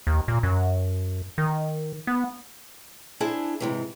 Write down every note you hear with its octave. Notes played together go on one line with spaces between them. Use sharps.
D#2
A#2
F#2
D#3
B3
D4 E4 G#4 C5 A5
G#2 C3 E3